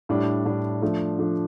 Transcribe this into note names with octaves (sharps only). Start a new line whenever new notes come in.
A2 G3 D4
A2 G3 D4
F3 A3 D4
F3 A3 D4